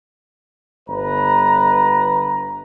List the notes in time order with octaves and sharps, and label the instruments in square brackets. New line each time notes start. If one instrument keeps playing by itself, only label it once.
[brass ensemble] G1 B4 A#5